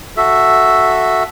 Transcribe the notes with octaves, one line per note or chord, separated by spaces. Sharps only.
F#4 A4 E5